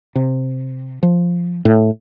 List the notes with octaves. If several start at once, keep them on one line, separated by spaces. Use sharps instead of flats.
C3
F3
A2